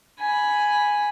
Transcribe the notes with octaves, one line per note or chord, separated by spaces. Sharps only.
G#5 B5